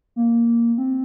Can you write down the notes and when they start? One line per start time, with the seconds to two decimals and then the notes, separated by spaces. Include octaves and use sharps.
0.16 A#3
0.78 C4